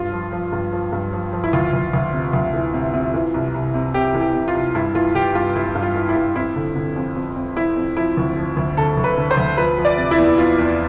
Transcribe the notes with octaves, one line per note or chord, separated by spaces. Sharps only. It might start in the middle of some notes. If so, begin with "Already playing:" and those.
Already playing: G2 F4
F3
F3
G2
F3
G2
F3
F3
E4
D2 F4
D2
D2
C3
D2
E3
C3
C3
E3
C2
C2
C3
C3 G4
E3
G4
C3
F4
C2
G2 E4
E3 F4
E3 G4
G2 F4
E3 E4
G2
F4
E3
E4
G2
F2 E4
D3
D3
F2
F2
F2
F2 E4
F2
F3 E4
D2
F3
D2
D3 A4
D2
B4
D3
C5
D2
F3 B4
F3
D5
C3
E4
E2
E2 F4
E2